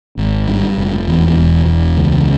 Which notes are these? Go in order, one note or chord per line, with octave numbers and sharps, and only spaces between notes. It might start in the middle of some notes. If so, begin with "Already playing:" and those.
G#1
G2
F1
E2
E1
E2
C#2